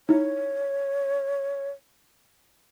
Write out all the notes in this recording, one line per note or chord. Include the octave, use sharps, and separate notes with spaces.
D#4 E4 C#5